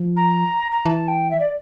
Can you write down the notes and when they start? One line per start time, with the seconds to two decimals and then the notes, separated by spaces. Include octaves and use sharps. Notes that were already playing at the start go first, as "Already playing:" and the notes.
Already playing: F3
0.17 A#5
0.72 A#5
0.85 E3 A5
1.08 G5
1.31 E5
1.40 D5